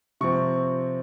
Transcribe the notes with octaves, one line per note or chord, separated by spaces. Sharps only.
C3 F3 C4 C#6